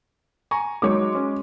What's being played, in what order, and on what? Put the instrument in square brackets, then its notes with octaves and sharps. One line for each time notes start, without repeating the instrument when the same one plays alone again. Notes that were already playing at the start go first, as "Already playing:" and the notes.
[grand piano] G#5 A#5 C#6
[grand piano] F#3 D#4 C#5 [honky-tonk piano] G#3 D6
[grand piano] C#4